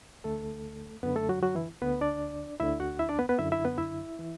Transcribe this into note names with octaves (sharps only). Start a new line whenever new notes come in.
D2 D3 A3 A4
F#2 D3 B3 B4
A3 A4
F#3 F#4
F#3 F#4
E3 E4
D2 D3 B3 B4
D4 D5
D2 D3 E4 E5
F#4 F#5
E4 E5
D4 D5
B3 B4
B3 B4
F#2 D3 E4 E5
E4 E5
B3 B4
E4 E5
E3